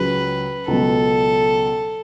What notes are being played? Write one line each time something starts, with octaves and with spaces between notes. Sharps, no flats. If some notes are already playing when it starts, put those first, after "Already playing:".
Already playing: C#2 C#3 F#3 C#4 F#4 B4
C#2 B2 F#3 A4